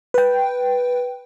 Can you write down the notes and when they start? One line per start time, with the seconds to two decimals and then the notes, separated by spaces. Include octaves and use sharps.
0.14 B4 G5